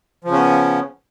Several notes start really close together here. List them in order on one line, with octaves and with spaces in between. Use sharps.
F3 C#3 C#4 B3